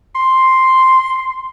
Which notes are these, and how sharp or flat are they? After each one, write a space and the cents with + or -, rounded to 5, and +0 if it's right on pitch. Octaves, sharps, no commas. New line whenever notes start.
C6 +0